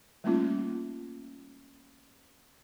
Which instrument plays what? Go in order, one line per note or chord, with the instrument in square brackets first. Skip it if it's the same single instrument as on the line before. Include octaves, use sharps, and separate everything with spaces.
[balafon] G3 A3 A#3 C#4 D#4 F4